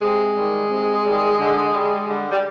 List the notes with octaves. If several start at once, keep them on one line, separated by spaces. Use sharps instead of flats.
C3 G#3
D#3 G3
C3
D#3 G3
D3
G3
D3 G3
G3